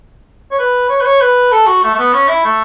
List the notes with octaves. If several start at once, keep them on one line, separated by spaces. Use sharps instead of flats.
C#5
B4
C#5
B4
C#5
B4
A4
F#4
A3
A3
B3
C#4
E4
A3